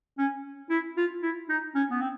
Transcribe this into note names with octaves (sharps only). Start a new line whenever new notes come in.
C#4
E4
F4
E4
D#4
C#4
B3
C4